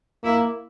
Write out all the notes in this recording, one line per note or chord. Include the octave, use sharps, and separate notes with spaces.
A#3 E4